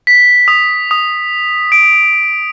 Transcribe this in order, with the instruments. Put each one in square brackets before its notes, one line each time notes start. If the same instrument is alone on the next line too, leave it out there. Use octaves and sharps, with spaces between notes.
[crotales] B6
D#6
D#6
D7